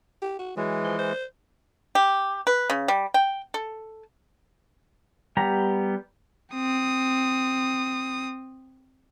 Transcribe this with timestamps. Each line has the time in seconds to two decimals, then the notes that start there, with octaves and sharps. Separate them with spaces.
0.22 G4
0.39 F#4
0.57 E3 F#3 G#3
0.84 F3
0.99 C5
1.95 G4
2.47 B4
2.70 C#3
2.88 G3
3.14 G5
3.54 A4
5.37 G3 B3 G4 A#5
6.53 C4 D#6